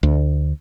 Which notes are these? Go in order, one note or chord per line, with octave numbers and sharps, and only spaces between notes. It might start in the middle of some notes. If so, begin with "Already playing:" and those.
D2